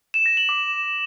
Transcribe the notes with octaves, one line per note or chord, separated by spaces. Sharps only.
E7
A#6
F#7
D6